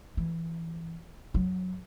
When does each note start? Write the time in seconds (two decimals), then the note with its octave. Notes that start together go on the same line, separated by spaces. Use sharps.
0.17 E3
1.34 F#2 F#3